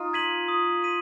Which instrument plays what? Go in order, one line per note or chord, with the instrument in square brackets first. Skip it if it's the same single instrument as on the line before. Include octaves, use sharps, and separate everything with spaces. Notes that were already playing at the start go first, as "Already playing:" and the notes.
Already playing: [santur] D#4 F4
[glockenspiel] G#6 B6 D#7 F#7
D#6
B6 D#7 F#7